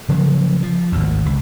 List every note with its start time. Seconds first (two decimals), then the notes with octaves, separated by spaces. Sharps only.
0.09 C#3 F3 F#3 A#3
0.63 F3
0.92 G#1 D2
1.26 C#2